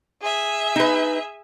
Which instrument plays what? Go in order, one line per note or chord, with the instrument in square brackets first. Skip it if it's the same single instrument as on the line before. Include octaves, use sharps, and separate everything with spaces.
[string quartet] G#4 E5
[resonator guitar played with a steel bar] D#4 B4